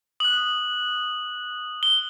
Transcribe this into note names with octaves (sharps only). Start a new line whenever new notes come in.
D#6 F#6 F#7
G7